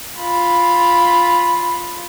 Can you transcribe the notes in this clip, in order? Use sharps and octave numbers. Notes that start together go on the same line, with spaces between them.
F4 B5